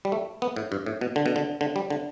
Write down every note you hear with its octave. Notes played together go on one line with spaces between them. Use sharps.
G3
A3
B3
A2
G2
A2
B2
D3
B2
D3
D3
G3
D3